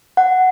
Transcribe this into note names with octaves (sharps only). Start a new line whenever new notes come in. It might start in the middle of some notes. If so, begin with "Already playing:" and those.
F#5